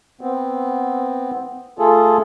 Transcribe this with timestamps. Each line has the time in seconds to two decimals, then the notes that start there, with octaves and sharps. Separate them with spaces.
0.21 B3 C4
1.79 A3 F4 G#4 A4